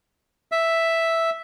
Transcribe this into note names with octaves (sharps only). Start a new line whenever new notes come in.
E5